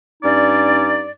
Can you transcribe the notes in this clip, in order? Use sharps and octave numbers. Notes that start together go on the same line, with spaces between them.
G2 C#4 D#4 D5